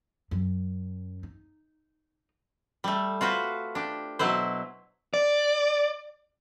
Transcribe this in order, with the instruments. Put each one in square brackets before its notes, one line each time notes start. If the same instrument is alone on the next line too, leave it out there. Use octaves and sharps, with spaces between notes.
[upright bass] F#2
D#4
[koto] G3 A3
F4 F#4 B4 C5
D4 G4
B2 F#3 E4 B4 C5
[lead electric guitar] D5